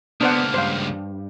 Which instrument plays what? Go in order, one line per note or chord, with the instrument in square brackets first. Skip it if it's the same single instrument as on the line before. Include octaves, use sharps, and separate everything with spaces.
[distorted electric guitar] C#2 A#3 [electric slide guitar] B3 [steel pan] D4 C5 F#5
[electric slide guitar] G2 [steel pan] C5 F5